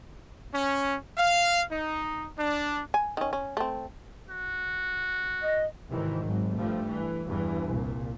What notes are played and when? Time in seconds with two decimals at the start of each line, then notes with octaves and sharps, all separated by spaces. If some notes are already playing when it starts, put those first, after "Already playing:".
0.54 C#4
1.17 F5
1.70 D#4
2.37 D4
2.94 G#5
3.17 D#3 C#4
3.33 C#4
3.57 A3 C4
4.29 F#4
5.41 D#5
5.90 G#1 C3 D#3 E3
6.24 G#1 G#2 F#3
6.56 G2 F3 G3 A3
6.87 E3
7.27 E2 G2 E3
7.67 C2 A#2